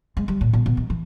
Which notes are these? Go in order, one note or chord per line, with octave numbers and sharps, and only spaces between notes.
G#3
G3
A#2
B2
B2
D#3
E3